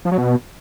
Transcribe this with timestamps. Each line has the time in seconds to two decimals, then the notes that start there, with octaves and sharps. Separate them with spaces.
0.05 F3
0.12 F#3
0.18 B2